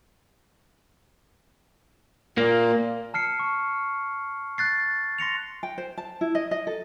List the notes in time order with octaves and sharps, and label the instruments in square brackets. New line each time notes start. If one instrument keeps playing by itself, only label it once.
[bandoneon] A#2 [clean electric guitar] A#3
[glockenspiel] A5 F6 C7 C#7
C#6
F#6 A6 C7
C6 A#6 C#7 F7
[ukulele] G5
C5
A5
E4
D#5
D#5
A4